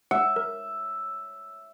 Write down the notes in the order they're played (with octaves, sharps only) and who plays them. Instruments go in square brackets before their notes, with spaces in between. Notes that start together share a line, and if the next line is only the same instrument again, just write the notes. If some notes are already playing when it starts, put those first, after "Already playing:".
[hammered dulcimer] E5 [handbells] F#5
[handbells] A#4